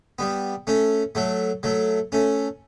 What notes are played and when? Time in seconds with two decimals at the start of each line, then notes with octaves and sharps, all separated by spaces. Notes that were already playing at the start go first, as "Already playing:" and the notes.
0.19 G3 B3
0.67 A3 C#4
1.15 F#3 A3
1.63 F#3 A3
2.12 A3 C#4